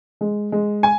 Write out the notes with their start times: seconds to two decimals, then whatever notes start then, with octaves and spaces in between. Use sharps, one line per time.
0.21 G#3
0.52 G#3
0.83 G#5